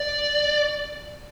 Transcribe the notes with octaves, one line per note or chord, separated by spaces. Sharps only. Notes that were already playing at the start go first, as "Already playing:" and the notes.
Already playing: D5